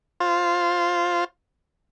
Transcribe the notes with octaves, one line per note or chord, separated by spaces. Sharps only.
F4 C5